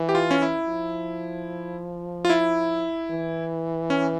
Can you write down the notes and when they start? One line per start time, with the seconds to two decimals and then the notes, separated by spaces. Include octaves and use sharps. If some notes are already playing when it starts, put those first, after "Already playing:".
Already playing: E3
0.09 G4
0.15 F4
0.31 C#4
0.42 E4
0.68 F3
2.25 F4
2.30 E4
3.11 E3
3.90 C#4